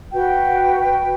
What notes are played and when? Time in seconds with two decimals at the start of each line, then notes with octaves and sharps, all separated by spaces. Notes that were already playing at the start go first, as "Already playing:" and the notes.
0.11 F#4 B4 G5